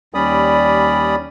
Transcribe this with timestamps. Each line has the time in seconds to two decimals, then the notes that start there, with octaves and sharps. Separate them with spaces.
0.14 D#2 G3 C#4 D5 B5 D#6